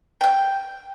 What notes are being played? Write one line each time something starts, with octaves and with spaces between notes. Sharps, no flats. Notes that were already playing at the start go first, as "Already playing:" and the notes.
G5 G6